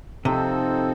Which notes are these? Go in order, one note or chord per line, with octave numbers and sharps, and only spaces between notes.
C3 F3 C4 D#4 A4 C5